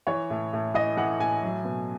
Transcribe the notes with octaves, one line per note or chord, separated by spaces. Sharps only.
E3 C#5
A2
A2
E3 D#5
E3 F#5
A2 G#5
F#3
B2